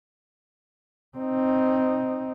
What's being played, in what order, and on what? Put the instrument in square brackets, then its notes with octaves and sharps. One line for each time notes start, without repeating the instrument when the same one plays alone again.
[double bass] C4 D#4